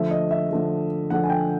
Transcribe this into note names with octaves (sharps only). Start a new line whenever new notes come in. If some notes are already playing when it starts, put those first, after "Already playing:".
Already playing: D3 F3 A3 E5
D#5
E5
D3 F3 A3
D3 F3 A3 F#5
G#5
G5